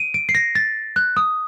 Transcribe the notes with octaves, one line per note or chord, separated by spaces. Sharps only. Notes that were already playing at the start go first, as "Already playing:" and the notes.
Already playing: D7 D#7
D7
C7
A#6
A6
F#6
D#6